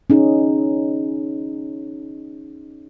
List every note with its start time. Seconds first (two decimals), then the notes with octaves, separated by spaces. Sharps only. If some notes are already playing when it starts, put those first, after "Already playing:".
0.10 C#4 D#4 G#4